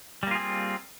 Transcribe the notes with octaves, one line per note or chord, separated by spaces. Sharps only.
G3 A#3 C4 F4 G#4